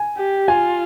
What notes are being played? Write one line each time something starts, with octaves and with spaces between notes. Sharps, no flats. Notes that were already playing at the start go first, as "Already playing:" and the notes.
Already playing: G#5
G4
F4 G#5